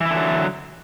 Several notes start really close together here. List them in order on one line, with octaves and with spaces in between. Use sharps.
E3 E4 D3 F#3